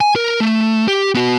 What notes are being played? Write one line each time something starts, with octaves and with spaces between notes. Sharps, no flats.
G#5
A#4
A3
G4
B3 F#4